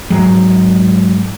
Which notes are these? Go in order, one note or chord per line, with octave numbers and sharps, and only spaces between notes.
G#2 F#3 G#3